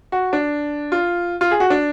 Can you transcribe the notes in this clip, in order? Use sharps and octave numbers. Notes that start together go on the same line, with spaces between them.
F#4
D4
F4
F4
G#4
F#4
D4